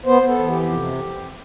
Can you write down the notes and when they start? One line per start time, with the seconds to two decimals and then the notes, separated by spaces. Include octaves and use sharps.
0.06 B3 C5
0.22 B3
0.28 A4
0.38 E3
0.49 G4
0.55 F2
0.71 C3